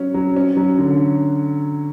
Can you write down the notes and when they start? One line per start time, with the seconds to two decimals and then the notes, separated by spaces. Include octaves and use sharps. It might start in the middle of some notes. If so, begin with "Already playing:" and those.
Already playing: F#3 C#4
0.14 F#3
0.36 C#4
0.57 F#3
0.78 D3